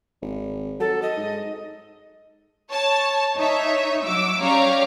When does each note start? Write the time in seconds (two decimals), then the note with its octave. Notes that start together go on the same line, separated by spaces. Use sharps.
0.22 G#1
0.80 F#3 A4
1.02 D#5
1.16 G#2
2.71 C#5 A5
3.37 D#4 C#5 E5
4.03 F#3 D6 E6
4.42 C#4 G4 C#5 D5 F5 A#5